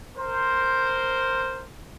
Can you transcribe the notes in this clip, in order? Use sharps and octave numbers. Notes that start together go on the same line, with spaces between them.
A#4 C5